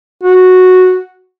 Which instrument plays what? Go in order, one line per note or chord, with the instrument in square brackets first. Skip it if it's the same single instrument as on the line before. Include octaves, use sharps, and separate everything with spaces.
[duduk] F#4